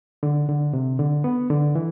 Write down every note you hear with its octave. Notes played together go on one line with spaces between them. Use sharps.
D3
D3
C3
D3
B3
D3
E3